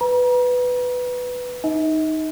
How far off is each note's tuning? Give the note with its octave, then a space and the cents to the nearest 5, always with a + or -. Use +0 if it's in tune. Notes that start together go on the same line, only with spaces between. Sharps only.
B4 +5 A#5 +40
D#4 +0 D#5 +45